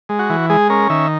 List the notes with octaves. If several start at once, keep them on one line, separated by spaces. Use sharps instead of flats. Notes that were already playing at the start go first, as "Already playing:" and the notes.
G#3
F#4
E3
G#3 G#4
C#4 A#4
D#3 E5